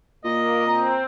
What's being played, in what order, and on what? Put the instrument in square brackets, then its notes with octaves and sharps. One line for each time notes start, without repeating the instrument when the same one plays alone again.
[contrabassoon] A#2 [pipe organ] A#3 [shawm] D#5
[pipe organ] C4 [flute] A#5